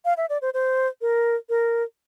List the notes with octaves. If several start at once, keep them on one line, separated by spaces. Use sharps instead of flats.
F5
E5
D5
C5
C5
A#4
A#4